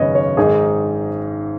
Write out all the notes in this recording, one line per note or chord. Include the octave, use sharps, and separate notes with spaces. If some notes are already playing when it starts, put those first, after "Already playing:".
Already playing: G#1 F#2 C#3 G#3 B3 C#5 D#5
C#5
G#1 G#2 D#3 G#3 D#4 G#4